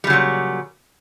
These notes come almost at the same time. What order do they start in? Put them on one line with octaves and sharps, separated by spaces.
G3 C#3 F#3 A#2